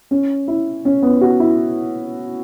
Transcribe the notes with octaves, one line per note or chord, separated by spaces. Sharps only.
C#4
E4
C#4
B3
F#4
E4